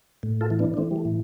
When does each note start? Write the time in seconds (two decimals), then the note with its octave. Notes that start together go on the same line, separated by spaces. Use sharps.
0.23 A2
0.41 F4 A4
0.50 E3
0.59 B3 D4
0.74 D4
0.77 E3 A3 C4
0.91 G3
0.96 A3
1.05 A2